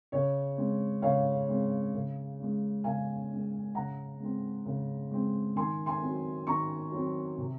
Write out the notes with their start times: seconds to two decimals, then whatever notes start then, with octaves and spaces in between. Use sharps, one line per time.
0.12 C#3 C#5
0.58 G#3 C4
1.02 C#3 C#5 F5
1.49 G#3 C4
1.94 C#3
2.39 G#3 C#4
2.84 C#3 F5 G#5
3.29 G#3 C#4
3.75 C#3 F#5 A#5
4.20 G#3 C4
4.65 C#3
5.11 G#3 C4
5.56 D#3 G#5 C6
5.86 G#5 C6
6.01 F#3 C4
6.47 D#3 A#5 C#6
6.92 F#3 C4
7.38 C3